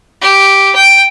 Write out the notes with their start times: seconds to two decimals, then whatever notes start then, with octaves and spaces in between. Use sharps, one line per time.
0.21 G4
0.75 G5